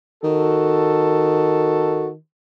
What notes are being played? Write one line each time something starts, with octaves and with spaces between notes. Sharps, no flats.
D#3 F#4 A4